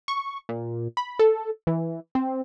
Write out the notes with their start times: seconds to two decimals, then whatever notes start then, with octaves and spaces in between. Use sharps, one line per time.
0.08 C#6
0.49 A#2
0.97 B5
1.19 A4
1.67 E3
2.15 C4